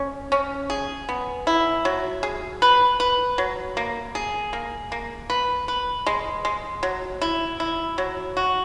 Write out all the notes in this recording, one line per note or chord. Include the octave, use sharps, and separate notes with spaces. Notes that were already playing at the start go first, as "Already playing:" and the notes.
Already playing: C#4
C#4
G#4
B3
E4
F#3
G#4
B4
B4
F#3
A#3
G#4
A#3
A#3
B4
B4
G#3
G#3
F#3
E4
E4
F#3
F#4